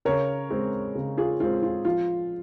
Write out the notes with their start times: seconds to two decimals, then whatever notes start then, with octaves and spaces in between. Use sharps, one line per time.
0.05 C#3 A#4 C#5
0.50 G#3 C4
0.95 C#3
1.17 F4 G#4
1.40 G#3 C4 F4
1.63 F4
1.85 F3 F4